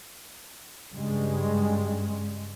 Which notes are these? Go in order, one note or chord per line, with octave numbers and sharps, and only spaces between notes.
G2 C#3 G3 G#3